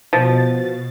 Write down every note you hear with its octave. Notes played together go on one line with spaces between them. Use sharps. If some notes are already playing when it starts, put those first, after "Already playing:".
B2 F3 A6